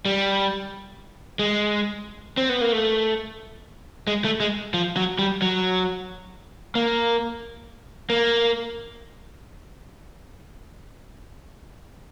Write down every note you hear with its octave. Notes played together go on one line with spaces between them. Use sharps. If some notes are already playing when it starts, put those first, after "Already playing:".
G3
G#3
C4
B3
A#3
A3
G#3
A3
G#3
F3
F#3
G3
F#3
A#3
A#3